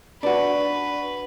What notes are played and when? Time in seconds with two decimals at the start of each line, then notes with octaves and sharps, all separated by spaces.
0.23 D4 F#4 B4